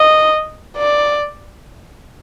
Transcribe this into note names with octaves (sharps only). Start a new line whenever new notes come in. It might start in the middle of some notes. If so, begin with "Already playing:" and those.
Already playing: D#5
D5